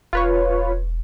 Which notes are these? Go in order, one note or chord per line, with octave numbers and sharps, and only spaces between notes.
E1 F4 B4 C#5